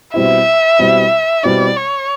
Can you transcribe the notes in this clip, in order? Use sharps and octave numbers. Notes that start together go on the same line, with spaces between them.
B2 G3 C4 E4 E5
B2 G3 C4 E4
B2 G3 C4 E4 D5
C#5